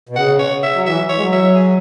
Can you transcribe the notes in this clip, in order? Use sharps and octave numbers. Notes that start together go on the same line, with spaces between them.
B2
C#3 F#5
C#5
E5
F#3
E3 E5
C#5
G#3
F#3
E5
G#4